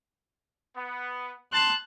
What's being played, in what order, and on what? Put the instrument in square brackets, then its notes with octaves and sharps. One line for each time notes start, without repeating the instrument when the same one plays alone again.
[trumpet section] B3
[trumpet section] A5 C6 [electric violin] F#6